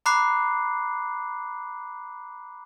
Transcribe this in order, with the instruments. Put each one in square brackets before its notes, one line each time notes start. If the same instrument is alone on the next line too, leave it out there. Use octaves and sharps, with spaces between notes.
[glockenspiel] A#5 B5 D6 F#6 C7